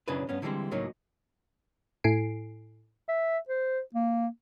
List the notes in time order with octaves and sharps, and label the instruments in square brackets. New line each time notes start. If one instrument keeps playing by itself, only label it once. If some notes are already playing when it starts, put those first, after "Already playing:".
[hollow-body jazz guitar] B1 F#2 C#3 D4 E4 B4
G2 B3 C#4
D3 E3 G3 G#3 C4
C#2 A2 F#3 A#3 D#4
[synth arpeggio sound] A2 E4 A4 G#5 C7 D7
[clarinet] E5
C5
A#3